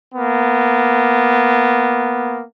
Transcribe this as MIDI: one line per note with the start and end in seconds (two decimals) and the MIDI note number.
0.14 2.43 58
0.14 2.43 59